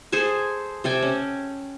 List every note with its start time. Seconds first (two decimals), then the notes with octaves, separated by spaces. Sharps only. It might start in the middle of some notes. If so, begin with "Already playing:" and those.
0.12 G#4 A4 C5 G#5
0.84 C3 A4 G5 G#5
1.02 C#4